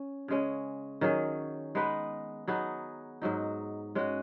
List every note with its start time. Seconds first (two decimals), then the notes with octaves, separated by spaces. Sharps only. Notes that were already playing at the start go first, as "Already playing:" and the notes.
Already playing: C#4
0.28 C#3 G#3 C#4
1.01 D#3 F#3 C#4 G#4
1.75 G#3 B3 D#4 B4
2.47 F#3 B3 D#4 G#4
3.22 G#2 F#3 D#4
3.95 G#3 C#4 F#4